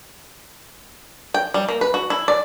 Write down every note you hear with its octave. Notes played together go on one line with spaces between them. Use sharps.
G5
G3
A#3
B4
F#4
E4
D5